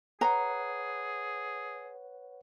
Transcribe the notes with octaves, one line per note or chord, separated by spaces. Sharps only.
G#4 B4 C#5 F#5 A#5